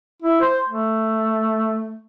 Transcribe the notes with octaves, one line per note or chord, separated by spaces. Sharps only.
E4
C5
A3